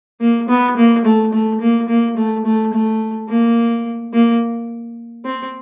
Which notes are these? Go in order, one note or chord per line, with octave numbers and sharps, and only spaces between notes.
A#3
B3
A#3
A3
A3
A#3
A#3
A3
A3
A3
A#3
A#3
C4